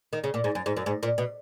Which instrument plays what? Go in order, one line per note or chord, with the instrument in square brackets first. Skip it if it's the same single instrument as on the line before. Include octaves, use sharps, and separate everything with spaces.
[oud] D#3
C#3
A#2
G#2
F#2
G#2
F#2
G#2
A#2
B2